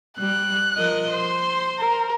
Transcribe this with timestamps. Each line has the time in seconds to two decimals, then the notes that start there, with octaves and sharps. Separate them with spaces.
0.19 G3 F#6
0.77 F3 A#4 D#5
1.11 C5 C6
1.79 A#4